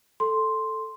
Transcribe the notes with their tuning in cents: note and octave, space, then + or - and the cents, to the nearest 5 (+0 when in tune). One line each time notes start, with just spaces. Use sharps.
A4 +0 C6 +0